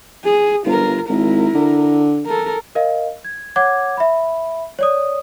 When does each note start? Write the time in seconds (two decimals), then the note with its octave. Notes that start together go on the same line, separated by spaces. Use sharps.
0.24 G#4
0.66 G1 F4 A#4
1.09 G#1 E4 A#4
1.55 D3
2.27 A4 A#4
2.75 A#4 D#5 F5
3.25 G#6
3.56 C#5 F#5 D6 G#6
3.97 E5 B5
4.79 C#5 D5 D#6